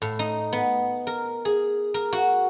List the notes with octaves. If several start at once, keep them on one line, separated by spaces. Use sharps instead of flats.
A2
D#4
B3
A#4
G#4
A#4
F#4